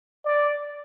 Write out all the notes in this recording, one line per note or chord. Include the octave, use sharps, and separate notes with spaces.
D5